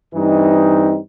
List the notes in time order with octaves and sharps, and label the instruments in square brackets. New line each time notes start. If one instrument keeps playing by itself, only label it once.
[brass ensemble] G2 E3 G3 C4 D#4